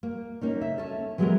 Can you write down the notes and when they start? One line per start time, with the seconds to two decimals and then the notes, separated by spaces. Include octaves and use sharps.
0.03 A#3
0.41 A#3 C#4 D#4
0.61 C#3 E5
0.78 C#4 A4
1.18 E3 F#3 G#3 B3 G4 A#4